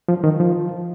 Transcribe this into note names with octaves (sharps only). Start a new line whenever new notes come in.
F3
D#3
F3